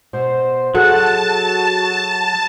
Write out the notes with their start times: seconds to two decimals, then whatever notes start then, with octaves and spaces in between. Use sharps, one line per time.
0.13 B2 C5
0.75 F#3 F#4 G#4 A4 F#5 A5 F#6